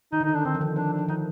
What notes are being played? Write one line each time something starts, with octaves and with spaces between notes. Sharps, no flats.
D#3 D#4
D3
D#4
D#3
D4
D3 C4
F3
D#3
F3 D4
D4
F3
D#3 D#4